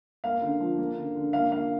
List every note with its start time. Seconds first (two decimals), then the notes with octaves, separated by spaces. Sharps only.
0.24 A#3 F5
0.42 D3
0.60 F3
0.78 A#3
0.97 D3
1.15 D3
1.33 A#3 F5
1.51 A#3 F5